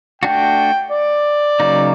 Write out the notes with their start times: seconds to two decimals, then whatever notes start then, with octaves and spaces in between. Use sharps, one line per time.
0.22 A3 D4 F#4 G5
0.91 D5
1.60 C#3 F#3 A#3 D#4